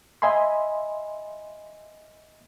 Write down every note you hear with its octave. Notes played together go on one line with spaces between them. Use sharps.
D#5 E5 G#5 B5 C6